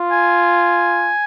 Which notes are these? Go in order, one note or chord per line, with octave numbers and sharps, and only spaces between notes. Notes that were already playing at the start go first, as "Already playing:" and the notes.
Already playing: F4
G#5